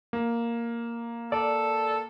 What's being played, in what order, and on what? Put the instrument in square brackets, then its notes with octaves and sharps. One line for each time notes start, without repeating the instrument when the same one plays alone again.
[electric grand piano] A#3
[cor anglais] A4 [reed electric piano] D5